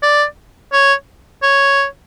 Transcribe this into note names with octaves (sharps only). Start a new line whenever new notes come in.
D5
C#5
C#5